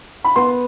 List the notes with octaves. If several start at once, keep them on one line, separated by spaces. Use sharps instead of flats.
B5
B3 C6